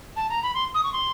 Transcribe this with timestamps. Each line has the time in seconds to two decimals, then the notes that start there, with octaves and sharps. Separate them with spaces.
0.16 A5
0.29 A#5
0.43 B5
0.54 C6
0.74 D#6
0.83 C#6
0.93 C6